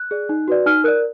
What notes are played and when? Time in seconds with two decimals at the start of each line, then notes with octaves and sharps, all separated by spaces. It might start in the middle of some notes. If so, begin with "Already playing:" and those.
Already playing: F#6
0.11 G#4 D5
0.29 D#4
0.48 F#4 B4 D5
0.66 D#4 F6
0.84 A#4 D5 F#6